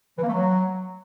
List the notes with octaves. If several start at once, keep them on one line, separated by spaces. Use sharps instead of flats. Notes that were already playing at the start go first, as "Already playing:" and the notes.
E3
A#3
A3
F#3